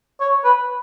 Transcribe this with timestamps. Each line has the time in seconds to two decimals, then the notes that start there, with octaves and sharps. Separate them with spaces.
0.20 C#5
0.44 B4